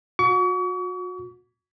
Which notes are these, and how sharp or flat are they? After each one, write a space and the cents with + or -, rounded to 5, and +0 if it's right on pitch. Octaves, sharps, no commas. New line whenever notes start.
F#4 -35 C#6 +40